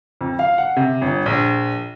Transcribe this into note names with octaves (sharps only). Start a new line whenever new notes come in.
F2
F5
F#5
C3
G1
A#1